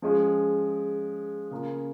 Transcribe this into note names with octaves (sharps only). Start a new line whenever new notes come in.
F3 G#3 C#4 G#4
C#3 A#3 F4